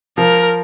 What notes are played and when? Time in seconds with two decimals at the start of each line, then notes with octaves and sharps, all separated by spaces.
0.18 F3 A#4